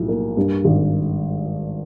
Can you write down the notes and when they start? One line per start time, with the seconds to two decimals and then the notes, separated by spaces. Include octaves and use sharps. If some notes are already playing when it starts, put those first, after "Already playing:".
Already playing: B1 A2 F3
0.08 A#3
0.37 G2
0.65 G#1